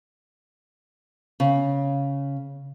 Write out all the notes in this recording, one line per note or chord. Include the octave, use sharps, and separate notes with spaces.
C#3